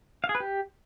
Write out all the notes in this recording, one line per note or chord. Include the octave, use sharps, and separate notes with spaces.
F5
G#4
B4
G4